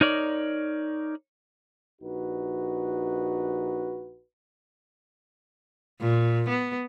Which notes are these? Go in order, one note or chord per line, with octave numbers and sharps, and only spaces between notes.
D#4 A#4 C#5 D5
A#1 D#4 F#4 B4
A#2
B3